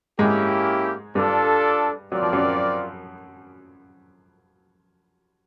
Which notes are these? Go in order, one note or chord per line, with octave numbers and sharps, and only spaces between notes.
G#2 G#3 A#3 C#4 E4 G4
G2 G3 D4 F4 A4 D5
F#3 C4 F4 A#4 D5
F3
F#2 F#3